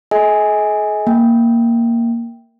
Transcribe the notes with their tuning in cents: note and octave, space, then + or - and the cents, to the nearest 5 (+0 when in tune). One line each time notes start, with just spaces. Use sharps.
G#4 +45 D#5 +40 G#5 +0
A#3 +0 G5 +0